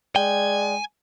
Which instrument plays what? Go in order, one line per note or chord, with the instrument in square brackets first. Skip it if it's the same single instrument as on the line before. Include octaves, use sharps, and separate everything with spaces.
[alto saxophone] G#3 [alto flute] D5 [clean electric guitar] G5 [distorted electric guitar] G#5